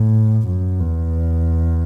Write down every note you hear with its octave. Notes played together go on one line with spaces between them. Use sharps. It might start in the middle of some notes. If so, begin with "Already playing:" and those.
Already playing: A2
F#2
E2